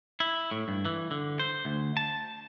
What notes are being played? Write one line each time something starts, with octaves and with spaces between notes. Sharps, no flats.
E4
A2
G2
E3
D3
C5
D2
A5